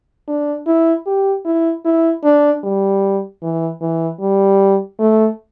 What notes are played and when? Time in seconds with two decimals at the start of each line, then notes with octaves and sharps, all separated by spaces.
0.28 D4
0.66 E4
1.07 G4
1.45 E4
1.85 E4
2.24 D4
2.64 G3
3.43 E3
3.81 E3
4.20 G3
4.99 A3